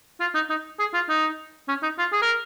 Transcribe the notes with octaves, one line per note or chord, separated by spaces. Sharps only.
F4
D#4
D#4
G#4
F4
D#4
C#4
D#4
F4
G#4
A#4